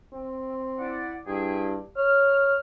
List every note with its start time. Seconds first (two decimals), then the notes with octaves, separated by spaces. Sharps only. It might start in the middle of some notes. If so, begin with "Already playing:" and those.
0.13 C4
0.79 E4 D5 F#5
1.27 G2 E4 G#4 G5
1.97 C#5 F6